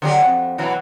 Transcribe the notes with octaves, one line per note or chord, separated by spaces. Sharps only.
D3 F#3 G4
F2
B2 E3 F#3